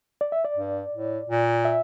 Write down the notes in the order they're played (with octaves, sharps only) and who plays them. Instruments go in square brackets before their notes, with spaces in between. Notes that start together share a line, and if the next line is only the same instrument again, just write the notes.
[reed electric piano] D5
E5
D5
[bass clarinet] G2
A2
A#2
[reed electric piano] E5